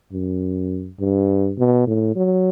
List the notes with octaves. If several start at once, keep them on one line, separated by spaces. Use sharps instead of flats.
F#2
G2
B2
A2
F#3